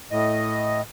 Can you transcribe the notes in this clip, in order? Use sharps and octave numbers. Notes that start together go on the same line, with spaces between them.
A2 D#5